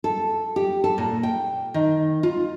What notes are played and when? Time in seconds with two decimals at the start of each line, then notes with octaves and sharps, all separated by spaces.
0.04 A4
0.56 G4
0.84 A4
0.98 A#2
1.23 G5
1.74 D#3
2.23 F4